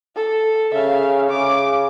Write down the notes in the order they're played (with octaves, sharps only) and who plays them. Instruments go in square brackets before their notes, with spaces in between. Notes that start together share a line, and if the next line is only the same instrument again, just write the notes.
[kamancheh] A4
[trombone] C#3 [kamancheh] E5 F5
[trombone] C#3 [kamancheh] D6